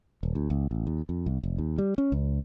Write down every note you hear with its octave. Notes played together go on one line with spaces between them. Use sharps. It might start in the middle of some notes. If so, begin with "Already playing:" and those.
D#1
D2
C#2
A1
D#2
F2
C2
F1
D#2
G3
C#4
C#2